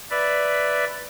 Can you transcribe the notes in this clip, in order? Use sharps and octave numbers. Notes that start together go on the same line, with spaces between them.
B4 D5 E5